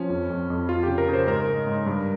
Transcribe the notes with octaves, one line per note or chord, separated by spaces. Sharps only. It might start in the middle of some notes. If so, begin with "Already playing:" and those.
Already playing: F3 C#4
F2
F2
F2
F2 F4
C#3 G4
A#4
C#3
C5
G#2 A#4
G#3
G#2
G2